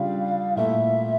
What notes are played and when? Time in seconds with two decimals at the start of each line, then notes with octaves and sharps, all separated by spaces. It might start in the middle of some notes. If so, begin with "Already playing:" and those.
Already playing: C#3 G3 D4 F4 F5
0.56 A#2 A3 E4 E5